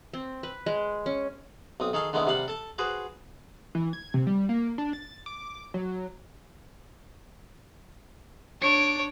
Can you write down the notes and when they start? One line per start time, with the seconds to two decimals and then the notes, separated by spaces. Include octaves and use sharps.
0.14 C4
0.43 B4
0.66 G#3
1.06 C#4
1.80 B1 C4 D#6
1.93 D#3 G#4 A4 F5
2.13 D3 D#3 G#3 B3 E4
2.27 C3 G3 F5 F#5 B5
2.48 A4 A5
2.78 F#4 G#4 B4 C5
3.75 E3
3.93 G#6
4.14 C3
4.27 G3
4.49 A#3
4.78 D4
4.93 A6
5.26 D6
5.74 F#3
8.62 D4 C#5 D7